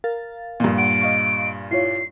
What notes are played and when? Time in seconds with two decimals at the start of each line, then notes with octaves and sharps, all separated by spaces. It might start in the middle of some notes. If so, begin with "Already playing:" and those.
0.04 A#4 F5 A6
0.60 G2 A#2
0.78 F#5 D7
1.02 D#5 F5 C#6
1.71 E4 F4 C#5 C7